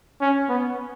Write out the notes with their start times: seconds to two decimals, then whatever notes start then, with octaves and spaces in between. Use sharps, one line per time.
0.21 C#4
0.49 B3